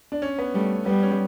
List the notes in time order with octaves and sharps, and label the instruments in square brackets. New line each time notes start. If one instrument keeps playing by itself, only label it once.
[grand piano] D4
C#4
B3
[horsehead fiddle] G3 [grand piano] A3
[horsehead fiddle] G3 [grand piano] B3
[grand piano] C#4